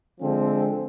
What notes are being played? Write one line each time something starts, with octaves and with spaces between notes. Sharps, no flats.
D3 F3 G#3 C4